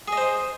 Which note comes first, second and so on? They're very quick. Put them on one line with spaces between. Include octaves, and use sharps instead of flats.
G#4 D#5 C5